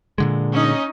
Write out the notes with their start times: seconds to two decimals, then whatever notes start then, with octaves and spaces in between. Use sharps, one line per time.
0.18 A#2 D3 G#3
0.54 C#4 D#4 D#5